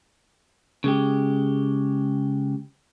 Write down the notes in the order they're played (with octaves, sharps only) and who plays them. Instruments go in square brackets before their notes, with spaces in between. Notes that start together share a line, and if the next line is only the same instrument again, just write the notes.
[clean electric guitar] C#3 G#3 G4